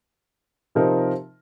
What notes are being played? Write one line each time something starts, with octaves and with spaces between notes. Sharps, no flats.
C3 F3 C4 D#4 A#4